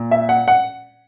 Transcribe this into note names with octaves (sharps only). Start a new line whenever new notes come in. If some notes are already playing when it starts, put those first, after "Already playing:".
Already playing: A#2
E5
F#5
F#5